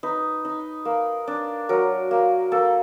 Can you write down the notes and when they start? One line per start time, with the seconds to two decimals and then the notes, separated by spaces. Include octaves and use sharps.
0.03 D#4 B4
0.45 D#4
0.85 A#3
1.27 D4
1.69 F#3 A#4
2.11 A#3
2.52 A#3 A4